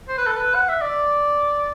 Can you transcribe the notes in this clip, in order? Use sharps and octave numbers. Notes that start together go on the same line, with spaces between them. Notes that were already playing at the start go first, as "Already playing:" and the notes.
C5
B4
A4
B4
F#5
E5
D5